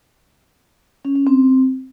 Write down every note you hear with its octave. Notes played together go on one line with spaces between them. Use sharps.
C#4
C#4
C4